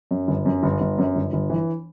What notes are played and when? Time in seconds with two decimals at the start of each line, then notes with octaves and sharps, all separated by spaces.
0.11 F#2
0.28 G1
0.46 F#2
0.63 G1
0.81 G1
0.98 F#2
1.15 G1
1.33 G1
1.50 E3